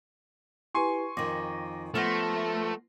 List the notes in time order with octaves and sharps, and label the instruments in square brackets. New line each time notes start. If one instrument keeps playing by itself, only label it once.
[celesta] E4 G4 B4 [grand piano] G#5 C6 C#6
[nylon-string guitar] F2 D#3 [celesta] D6 A#6
[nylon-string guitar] F3 B3 [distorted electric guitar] A3 [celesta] F6 A#6